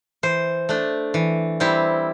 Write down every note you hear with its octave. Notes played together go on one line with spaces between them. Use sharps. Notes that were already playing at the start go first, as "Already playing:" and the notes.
E3 C5
A3 D4
E3
G3 C4 E4